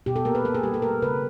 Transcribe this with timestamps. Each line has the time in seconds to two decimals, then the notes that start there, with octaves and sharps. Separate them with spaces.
0.06 B2 G4
0.16 A4
0.25 A#3 A#4
0.35 B4
0.45 A#3 A4
0.55 G#4
0.63 G3 G4
0.74 A4
0.82 A3 A#4
1.02 C#3 B4